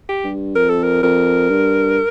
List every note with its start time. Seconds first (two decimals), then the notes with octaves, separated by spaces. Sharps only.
0.09 G4
0.24 G2
0.56 F2 A#4
0.70 A4
0.84 A#4
1.03 F2 A#4
1.50 G2